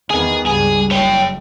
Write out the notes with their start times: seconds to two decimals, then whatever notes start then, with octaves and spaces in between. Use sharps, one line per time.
0.11 E2 D#3 B3 G#4
0.47 C#2 G2 G#4
0.91 F#1 C#5 G5